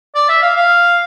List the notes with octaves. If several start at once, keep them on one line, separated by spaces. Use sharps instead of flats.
D5
E5
F5
F5